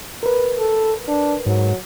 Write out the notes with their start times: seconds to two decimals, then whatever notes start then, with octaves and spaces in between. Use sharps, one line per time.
0.23 A#4 B4
0.59 A4
1.08 D4
1.46 G#2 F#3